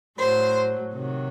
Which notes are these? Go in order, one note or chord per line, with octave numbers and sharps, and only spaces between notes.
A2 F#3 C5
C3 D#3 F#3